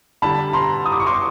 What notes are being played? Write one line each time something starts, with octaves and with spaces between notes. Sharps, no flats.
D3 G3 A5 B5
A#5 C6
D#6
D6
C#6
C6 D6